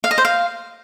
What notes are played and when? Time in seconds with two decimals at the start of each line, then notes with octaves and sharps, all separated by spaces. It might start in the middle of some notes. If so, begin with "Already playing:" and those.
0.04 F5
0.11 D#5
0.18 C5
0.25 F5